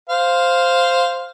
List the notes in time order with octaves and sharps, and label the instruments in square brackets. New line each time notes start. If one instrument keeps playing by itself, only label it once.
[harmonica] C5 F5